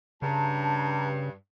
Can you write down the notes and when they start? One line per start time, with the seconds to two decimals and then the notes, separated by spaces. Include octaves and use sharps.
0.22 G2 C#3 A5 A#5